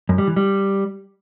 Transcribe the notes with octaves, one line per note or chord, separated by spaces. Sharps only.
F#2
G3
E3
G3